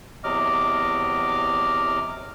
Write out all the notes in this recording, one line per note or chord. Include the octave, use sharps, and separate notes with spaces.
E2 C3 F#3 D#5 D6 F6